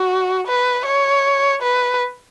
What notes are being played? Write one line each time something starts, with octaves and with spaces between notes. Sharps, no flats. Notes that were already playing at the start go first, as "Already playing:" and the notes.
Already playing: F#4
B4
C#5
B4